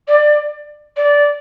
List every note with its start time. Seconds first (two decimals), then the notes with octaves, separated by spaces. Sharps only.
0.07 D5
0.96 D5